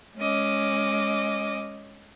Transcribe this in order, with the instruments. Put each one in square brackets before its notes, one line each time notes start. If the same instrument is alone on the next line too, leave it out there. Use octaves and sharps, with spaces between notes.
[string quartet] G#3 C#4 D#5 D6